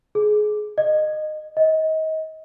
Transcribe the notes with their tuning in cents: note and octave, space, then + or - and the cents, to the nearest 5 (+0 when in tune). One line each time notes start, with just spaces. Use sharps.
G#4 +25
D#5 -20
D#5 +30